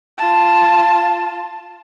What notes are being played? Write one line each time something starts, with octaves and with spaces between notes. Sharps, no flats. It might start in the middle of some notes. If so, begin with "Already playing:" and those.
F4 A5